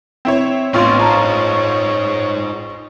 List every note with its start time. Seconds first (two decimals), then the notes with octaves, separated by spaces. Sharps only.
0.25 C4 E4 C#5
0.74 A1 B3 C4 D4 F4 C#5 C6 C#6
1.00 D#4 G#4 C5 A5 A#5